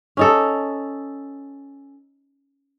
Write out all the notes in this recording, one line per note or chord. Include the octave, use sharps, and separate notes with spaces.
C#4 D#4 A4